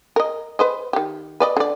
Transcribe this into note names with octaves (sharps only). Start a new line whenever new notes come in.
A#4 D#5
B4 C5 D#5
D#3 G4
B4 D5 D#5
D3 D5